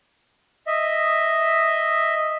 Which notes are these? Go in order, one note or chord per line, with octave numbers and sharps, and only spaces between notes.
D#5 E5